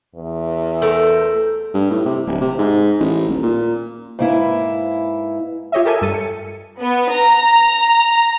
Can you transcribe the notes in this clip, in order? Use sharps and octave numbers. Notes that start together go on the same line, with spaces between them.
E2
A3 A#4 C5
G2
A2
C3
D1
C3
G#2
A1
D#1
A#2
G#2 A#3 E4 B4
F4 G4 C#5 D#5 E5
G4 A4 A#4 E5 G#5
G2 A4 D#7
C#7
B3
A#5